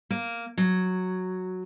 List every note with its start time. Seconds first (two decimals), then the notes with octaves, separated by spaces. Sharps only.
0.10 A#3
0.58 F#3